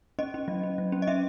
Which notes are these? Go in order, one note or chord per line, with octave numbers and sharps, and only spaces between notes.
C#4 D#5
C#4
F#3
C#4
F#3
C#4
D#5
C#4 E5